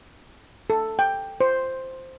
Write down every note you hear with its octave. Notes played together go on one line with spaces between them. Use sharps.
A4
G5
C5